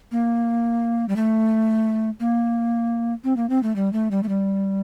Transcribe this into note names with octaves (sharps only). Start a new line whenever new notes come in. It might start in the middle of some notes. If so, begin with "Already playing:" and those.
A#3
G3
A3
A#3
C4
A#3
C4
A3
G3
A3
G3
A3
G3